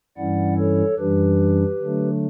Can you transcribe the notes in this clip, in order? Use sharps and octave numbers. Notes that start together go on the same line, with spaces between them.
G2 E3 G3 C#4 E4 D5 F#5
A4 C#5
F#2 E3 G3 D4 G4 B4
D3 F#3 A3 D4